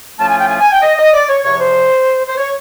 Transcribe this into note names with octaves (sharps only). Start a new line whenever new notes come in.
A2 F3 A3 C#4 F4 A5
G#5
G5
G#5
G#5
G5
D#5
D#5
D5
C#5
E2 C3 F3 C#5
C5
C5
C#5